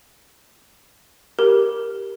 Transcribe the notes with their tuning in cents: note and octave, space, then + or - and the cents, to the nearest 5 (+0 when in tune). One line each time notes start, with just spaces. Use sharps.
G4 +0 A#4 +0